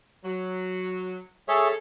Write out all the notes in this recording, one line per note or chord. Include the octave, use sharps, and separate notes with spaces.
F#3
G#3 G#4 A4 C#5 E5